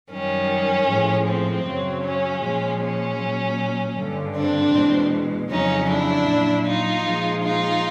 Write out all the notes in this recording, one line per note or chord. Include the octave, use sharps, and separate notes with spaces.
F#2 D#3 G3 C#4
A2 F3 G#3
C4
F#2 C#3 F#3
C#4
A#2 F3 G#3
C#4
A#2 F#3
G2 D3 G3
C4 D4
E2 B2 G#3
F2 C#3 F#3 C#4 D#4
D4 E4
A#2 F#3
D#4 F4
A#2 F3 G#3
D#4 F4